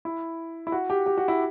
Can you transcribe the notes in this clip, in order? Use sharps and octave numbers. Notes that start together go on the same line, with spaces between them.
E4
E4
F#4
G4
G4
F#4
E4